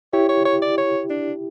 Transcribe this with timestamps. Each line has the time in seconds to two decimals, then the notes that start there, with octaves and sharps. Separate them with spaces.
0.13 E4 G4 C#5
0.29 C#5
0.45 C#5
0.62 D5
0.78 C#5
1.10 D4